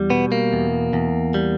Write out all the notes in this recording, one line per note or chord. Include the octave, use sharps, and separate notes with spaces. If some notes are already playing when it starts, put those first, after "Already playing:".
Already playing: E2 G3
B2 B3
A#3
E2
E2
G3